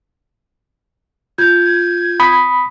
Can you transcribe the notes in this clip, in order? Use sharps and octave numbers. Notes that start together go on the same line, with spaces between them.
F4 G6 G#6
B5 D#6